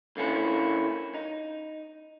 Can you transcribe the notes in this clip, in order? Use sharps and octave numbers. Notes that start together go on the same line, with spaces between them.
D3 A#3 C#4 E4
D#4